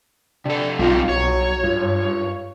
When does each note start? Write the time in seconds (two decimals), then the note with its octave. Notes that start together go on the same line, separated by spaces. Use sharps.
0.46 C3 D4 A4
0.79 B1 G3 C4 D#4 F4
1.09 B1 F#3 C#5
1.63 G2 F4